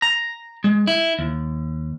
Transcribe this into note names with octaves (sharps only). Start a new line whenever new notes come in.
A#5
G#3
E4
D#2